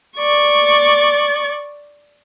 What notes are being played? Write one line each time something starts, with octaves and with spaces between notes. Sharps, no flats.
D5 C#6